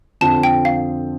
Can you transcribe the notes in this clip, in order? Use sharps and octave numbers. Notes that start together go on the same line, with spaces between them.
F2 D3 F3 C4 A5
G5
F5